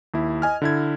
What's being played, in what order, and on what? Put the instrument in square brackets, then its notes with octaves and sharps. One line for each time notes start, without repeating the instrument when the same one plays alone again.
[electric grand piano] D#2 E4
D#5 G#5 F6
D3 E4 G#6